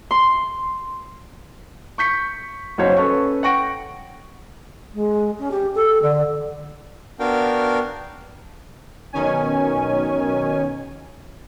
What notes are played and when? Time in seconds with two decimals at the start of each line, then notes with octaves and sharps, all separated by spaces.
0.11 C6
1.98 C#6 G6 B6 C#7
2.78 F#1 B1 C#4 C5 C#5
2.97 C#4 A4 B4 C#6
3.43 F#5 G5 C#6 A#6 D7
4.94 G#3
5.39 C#4
5.51 G4
5.75 A4
6.02 D3
7.19 B3 D4 F#4 A#4 F5 G5
9.12 B1 B2 D#3 C#4 G#5